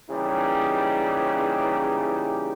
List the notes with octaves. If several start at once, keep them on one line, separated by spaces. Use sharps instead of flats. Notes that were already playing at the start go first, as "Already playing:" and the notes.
A#2 C#3 E3 G3 D#4 G4